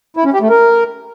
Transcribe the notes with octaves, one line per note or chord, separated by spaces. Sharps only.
E4
C#4
G4
A3
A#4